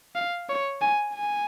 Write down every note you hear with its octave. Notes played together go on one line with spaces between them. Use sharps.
F5
C#5
G#5
G#5